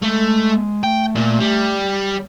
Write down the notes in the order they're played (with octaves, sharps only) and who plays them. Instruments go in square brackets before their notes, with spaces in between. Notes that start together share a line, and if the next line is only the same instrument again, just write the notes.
[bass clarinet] G#3 [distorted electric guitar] A3
[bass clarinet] A3 [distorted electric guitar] G5
[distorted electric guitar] A#2
G3